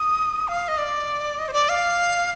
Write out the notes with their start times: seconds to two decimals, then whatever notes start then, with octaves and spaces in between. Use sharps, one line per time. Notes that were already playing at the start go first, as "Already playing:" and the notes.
Already playing: D#6
0.48 F5
0.68 D#5
0.78 D5
1.38 D#5
1.48 C5
1.53 D5
1.69 F5